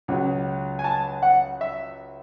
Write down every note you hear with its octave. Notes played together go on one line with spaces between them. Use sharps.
C#2 C#3 F#3
G#5
A5
F#5
E5